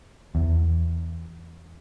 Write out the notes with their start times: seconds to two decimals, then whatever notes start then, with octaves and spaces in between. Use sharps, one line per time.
0.35 E2